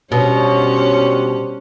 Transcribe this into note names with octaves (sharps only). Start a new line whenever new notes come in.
B2 G3 C#4 D4 C5 C#5